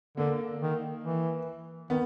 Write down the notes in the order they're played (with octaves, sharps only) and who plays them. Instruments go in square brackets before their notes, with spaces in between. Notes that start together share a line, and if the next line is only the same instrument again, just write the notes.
[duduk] D3 [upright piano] A#3
[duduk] D#3
E3
[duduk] D#3 [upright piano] B3